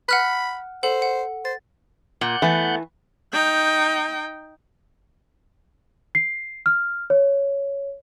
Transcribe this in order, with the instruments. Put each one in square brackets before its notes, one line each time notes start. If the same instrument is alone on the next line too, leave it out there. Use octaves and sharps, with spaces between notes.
[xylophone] F#5 F6 F#6 [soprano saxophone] B5
[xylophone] A4 F#5 F#7 [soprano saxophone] C5
[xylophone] F#5
[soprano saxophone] C5 [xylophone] A6
[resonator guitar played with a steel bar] A#2 [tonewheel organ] F#5 F#6 G6
[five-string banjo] E3 [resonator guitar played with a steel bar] A3 B3
[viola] D#4 G5
[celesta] C7
F6
C#5